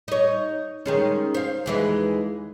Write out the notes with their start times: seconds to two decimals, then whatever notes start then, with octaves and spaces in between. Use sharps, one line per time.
0.08 D#4 C#5
0.86 D#3 G#3 C#4
1.34 C5 F5
1.66 D#2 E3 G#3